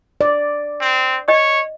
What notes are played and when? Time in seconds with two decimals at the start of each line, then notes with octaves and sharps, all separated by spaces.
0.21 D5
0.81 C4
1.28 C#5 D#5